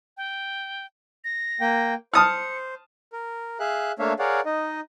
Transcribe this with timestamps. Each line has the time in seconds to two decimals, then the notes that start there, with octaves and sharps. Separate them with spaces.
0.17 G5
1.24 A#6
1.60 A#3 G5
2.14 C5 A5 D#6 F6 C#7
3.13 A#4
3.60 G#4 E5 F5 F#6
3.99 A3 A#3 D4 C#5 E5 F5
4.19 G#4 A#4 C#5 D5 F5 F#5
4.46 D#4 D#5